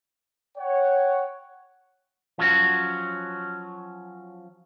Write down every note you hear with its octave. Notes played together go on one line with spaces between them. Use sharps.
C#5 F#5 G5
F3 F#3 C#4 F#4